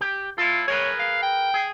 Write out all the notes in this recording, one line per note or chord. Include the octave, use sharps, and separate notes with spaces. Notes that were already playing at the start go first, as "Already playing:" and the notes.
G4
E4 F4 A4
G#4 A#4 B4 C#5
F5
G5
G#4